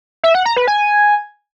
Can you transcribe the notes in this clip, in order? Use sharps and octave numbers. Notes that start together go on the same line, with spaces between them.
E5
F#5
A#5
B4
G#5